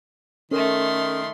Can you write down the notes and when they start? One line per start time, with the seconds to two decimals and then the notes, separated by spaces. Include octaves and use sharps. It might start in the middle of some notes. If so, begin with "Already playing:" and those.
0.51 D#3 A3 C#4 A4 A#4 C6